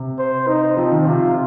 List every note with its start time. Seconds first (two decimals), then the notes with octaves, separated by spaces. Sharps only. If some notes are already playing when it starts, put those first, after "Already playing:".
Already playing: C3
0.18 C5
0.48 D#4
0.77 F3 C4
0.92 D#3
1.06 C3 F4